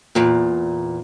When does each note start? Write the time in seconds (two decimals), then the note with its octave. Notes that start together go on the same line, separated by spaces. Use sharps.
0.15 E2 A#2